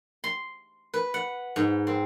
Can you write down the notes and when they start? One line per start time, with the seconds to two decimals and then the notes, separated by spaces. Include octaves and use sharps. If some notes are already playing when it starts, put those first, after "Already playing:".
0.24 C6
0.94 B4
1.14 F#5
1.56 G#2
1.87 C4